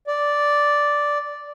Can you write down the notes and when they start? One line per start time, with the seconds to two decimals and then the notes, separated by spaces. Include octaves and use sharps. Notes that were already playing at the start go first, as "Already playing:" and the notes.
0.07 D5